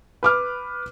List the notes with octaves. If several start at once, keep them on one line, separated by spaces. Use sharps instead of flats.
B4 D6 F6